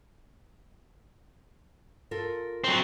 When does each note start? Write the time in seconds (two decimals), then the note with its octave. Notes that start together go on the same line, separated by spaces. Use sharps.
2.11 F4 A4 A#4
2.64 F#3 C4